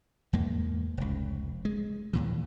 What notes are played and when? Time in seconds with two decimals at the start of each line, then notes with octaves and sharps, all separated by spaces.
0.33 E2 G#2 A#3
0.97 F1 C#2
1.65 G#3
2.13 D#2 A#2 E3